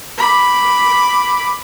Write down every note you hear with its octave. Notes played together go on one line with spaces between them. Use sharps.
B5 D6